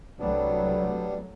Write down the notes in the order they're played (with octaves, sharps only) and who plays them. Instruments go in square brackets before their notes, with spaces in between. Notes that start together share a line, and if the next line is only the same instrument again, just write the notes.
[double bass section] C2 F#3 A3 [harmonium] G3 B3 D4